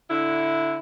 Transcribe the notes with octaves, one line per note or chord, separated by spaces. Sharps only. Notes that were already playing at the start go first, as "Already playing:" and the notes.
D3 E4